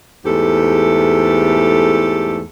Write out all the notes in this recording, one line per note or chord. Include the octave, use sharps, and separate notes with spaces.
E2 G#2 A3 G4 A4